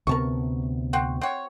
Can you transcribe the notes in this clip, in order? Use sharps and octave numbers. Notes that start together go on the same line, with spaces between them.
D2 C3 B3 A#4 A5 C#6
C4 F#4
C4 F#4 C#5